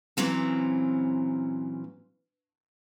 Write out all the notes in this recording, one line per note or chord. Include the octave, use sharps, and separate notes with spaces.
A#2 E3 F#3 C4 C#4